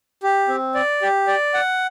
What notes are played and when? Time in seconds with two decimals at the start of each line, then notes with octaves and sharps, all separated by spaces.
0.23 G4
0.48 C4
0.75 D5
1.02 G4
1.27 D5
1.54 F#5